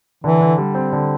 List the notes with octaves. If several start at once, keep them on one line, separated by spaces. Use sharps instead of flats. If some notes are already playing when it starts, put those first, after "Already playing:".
D3 E3
D3
G3
C4
D3